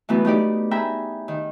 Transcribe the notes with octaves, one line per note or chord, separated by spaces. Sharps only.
E3 F#3 A3 B3
A3 D#4 G4 D5
G#4 E5 G5 A#5 B5
D#3